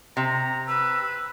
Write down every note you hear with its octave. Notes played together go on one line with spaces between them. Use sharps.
C3 A#5
B4 E6